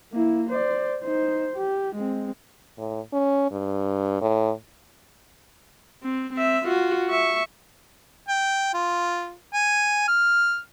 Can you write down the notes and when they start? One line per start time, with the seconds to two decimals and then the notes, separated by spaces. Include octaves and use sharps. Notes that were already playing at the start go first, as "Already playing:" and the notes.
0.13 A#3 E4
0.50 C5 D5
1.03 D#4 C5
1.56 G4
1.95 G#3 C4
2.78 A2
3.13 C#4
3.51 G2
4.21 A2
6.03 C4
6.33 C4 E5
6.65 F4 F#4
7.09 E5 C#6
8.28 G5
8.74 F4
9.54 G#5
10.08 F6